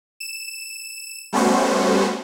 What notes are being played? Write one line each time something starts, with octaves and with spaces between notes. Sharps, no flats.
E7
G3 A3 B3 C#4 F#4 C5